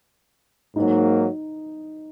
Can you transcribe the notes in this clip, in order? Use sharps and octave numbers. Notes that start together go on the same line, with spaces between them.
G#2 F#3 A#3 D#4